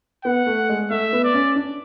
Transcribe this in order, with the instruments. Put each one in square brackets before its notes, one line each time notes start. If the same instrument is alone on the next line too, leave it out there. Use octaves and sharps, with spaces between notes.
[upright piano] B3 [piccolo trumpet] F#5
[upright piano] A3
G#3
[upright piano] A3 [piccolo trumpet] E5
[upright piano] B3
[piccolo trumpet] D5
[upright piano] C#4
D4